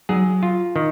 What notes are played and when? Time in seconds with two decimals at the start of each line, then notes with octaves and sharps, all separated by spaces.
0.09 F#3 G#4
0.43 F4
0.76 D#3